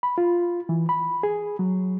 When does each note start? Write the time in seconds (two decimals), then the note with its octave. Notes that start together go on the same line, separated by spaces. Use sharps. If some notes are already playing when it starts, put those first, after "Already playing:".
0.03 B5
0.18 F4
0.69 E3
0.89 B5
1.23 G#4
1.59 F#3